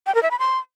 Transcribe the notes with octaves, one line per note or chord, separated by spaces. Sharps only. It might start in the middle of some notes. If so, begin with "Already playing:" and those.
G5
A#4
E5
B5
C6